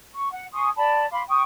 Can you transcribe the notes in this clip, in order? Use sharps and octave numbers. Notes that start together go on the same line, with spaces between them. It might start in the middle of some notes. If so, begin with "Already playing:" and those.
C#6
F#5
G#5 C6 C#6 D#6
D5 A5 B5
F5 B5 C6 D6
G5 C#6 D#6